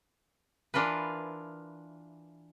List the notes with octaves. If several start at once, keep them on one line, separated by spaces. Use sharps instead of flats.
E3 D4 F4 A#4 B4